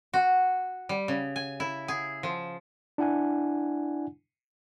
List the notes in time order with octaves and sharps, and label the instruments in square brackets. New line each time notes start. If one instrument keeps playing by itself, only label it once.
[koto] F#4
G3
C#3
G#5
E4
G#4
F3
[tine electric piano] D4 E4 F#5 G#5